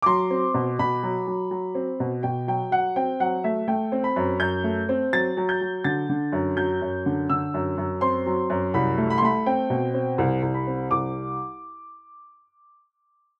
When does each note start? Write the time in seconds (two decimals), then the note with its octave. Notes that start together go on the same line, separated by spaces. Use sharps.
0.02 D6
0.06 F#3 C6
0.30 C4
0.54 B2
0.79 B2 B5
1.03 F#3
1.27 F#3
1.51 F#3
1.75 C4
2.00 B2
2.23 B2 G5
2.48 F#3 G5
2.71 F#3 F#5
2.96 C4 G5
3.20 F#3 F#5
3.44 A3 E5
3.68 A3 G5
3.92 C4
4.04 B5
4.16 F#2
4.40 F#2 G6
4.64 A3
4.89 C4
5.13 F#3 A6
5.37 F#3
5.49 G6
5.61 F#3
5.84 D3 A6
6.09 D3
6.32 F#2
6.57 F#3 G6
6.82 F#2
7.06 D3
7.30 D3 E6
7.54 F#2
7.78 F#2
8.01 C4 C6
8.26 F#3
8.50 F#2
8.74 C2 B5
8.98 A3
9.10 B5
9.18 C6
9.22 A3 B5
9.46 C4 G5
9.70 B2
9.94 C4
10.18 C2
10.43 C2
10.54 B5
10.67 C4
10.91 C2 D6